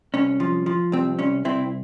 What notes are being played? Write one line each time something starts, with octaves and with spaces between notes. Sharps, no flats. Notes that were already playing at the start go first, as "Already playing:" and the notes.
C2 C#4
F3
F3
C2 C4
C2 C#4
C2 C4 E4